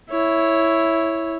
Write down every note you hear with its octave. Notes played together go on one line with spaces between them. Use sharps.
E4 C#5